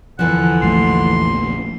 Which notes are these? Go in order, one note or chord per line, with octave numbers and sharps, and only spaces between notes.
E2 D3 E3 F3 F#5
A#1 A3 C6